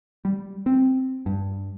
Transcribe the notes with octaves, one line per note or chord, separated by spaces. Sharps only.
G3
C4
G2